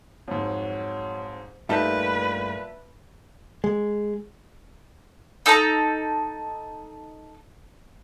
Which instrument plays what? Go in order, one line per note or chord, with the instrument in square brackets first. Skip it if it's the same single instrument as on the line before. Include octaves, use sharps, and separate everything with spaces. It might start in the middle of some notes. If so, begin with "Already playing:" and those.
[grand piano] F2 G#2 [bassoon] F#3
[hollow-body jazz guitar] G2 A3 D#4 [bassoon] A#2 [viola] B4 [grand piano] E5 A5 G6
[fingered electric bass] G#3
[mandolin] D#4 A4 A5 A#5